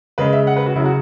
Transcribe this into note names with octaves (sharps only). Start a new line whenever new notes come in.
C#3 G#3 B4
E5
F#5
B4
F#4
C#3 F#3 E4
F#4